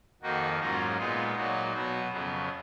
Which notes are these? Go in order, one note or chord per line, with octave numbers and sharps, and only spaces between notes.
F2 D#3 A#3 D#4 F#4
G#2 F#3 A#3 C#4 F4 G#4
A#2 G#3 B3 D#4 F4 G#4
A#2 F#3 A#3 D#4 F#4
B2 F#3 B3 F#4
F2 C#3 F#3 B3